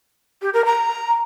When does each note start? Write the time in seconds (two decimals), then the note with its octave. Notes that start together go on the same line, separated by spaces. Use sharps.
0.42 G4
0.54 A#4
0.65 A#5